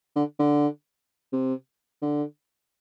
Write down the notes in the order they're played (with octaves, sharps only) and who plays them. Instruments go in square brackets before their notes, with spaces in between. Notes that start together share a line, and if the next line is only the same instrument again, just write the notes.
[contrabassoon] D3
D3
C3
D3